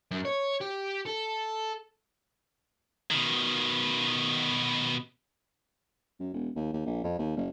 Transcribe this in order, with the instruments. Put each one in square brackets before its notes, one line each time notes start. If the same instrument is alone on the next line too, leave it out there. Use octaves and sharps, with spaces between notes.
[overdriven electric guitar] F#2
C#5
G4
A4
[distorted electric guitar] B2 D#3
[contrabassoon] F#2
E1
D#2
D#2
A#1
F2
D#2
F#1